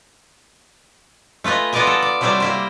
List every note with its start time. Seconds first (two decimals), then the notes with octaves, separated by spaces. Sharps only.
1.44 A3 F4 B4 D#5 G#5
1.73 B3 F4 A#4 D5 D#5 G#5
1.87 A4
2.02 D5
2.21 C3 F#3 G3 E4 C5 D5
2.40 A#3 E4 C5